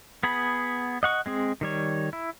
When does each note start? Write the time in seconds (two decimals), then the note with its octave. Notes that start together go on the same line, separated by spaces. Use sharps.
0.23 B3 G#4 B5
1.03 D#5 F#5 C#6
1.26 G#3 C4 G#4
1.61 D#3 G3 C#5
2.13 E4